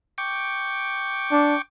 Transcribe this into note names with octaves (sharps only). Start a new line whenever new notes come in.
G5 C#6 D6
D4